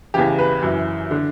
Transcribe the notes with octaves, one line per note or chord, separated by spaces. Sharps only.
E2 C#3 E3 G4
B4
F#2 E3
D3